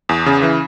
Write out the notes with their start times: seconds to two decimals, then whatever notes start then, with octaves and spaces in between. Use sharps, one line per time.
0.09 E2
0.26 C#3
0.42 E3